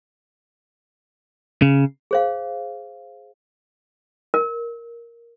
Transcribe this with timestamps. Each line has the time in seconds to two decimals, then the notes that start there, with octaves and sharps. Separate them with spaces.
1.62 C#3
2.11 G#4 C5 F5
4.34 A#4